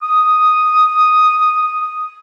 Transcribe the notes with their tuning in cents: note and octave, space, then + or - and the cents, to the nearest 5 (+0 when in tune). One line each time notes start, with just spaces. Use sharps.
D#6 +0